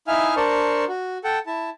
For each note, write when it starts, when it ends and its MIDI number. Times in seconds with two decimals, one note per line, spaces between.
0.08 0.35 63
0.08 0.35 64
0.08 0.35 76
0.08 0.35 77
0.08 0.35 80
0.08 0.35 89
0.37 0.85 62
0.37 0.85 70
0.37 0.85 72
0.37 0.85 74
0.37 0.85 81
0.37 0.85 85
0.88 1.18 66
1.24 1.39 69
1.24 1.39 78
1.24 1.39 79
1.24 1.39 81
1.47 1.70 64
1.47 1.70 81